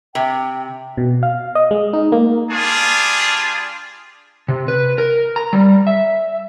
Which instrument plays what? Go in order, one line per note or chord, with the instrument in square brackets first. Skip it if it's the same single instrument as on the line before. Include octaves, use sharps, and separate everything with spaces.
[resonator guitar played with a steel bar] C3 [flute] G5
[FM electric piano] B2
F5
D#5
G#3
D#4
A#3
[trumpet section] G3 D4 F4 G#4
[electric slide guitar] C3
B4
A#4
A#5
G3
E5